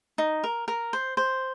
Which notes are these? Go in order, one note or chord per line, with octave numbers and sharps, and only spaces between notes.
D#4
A#4
A#4
C5
C5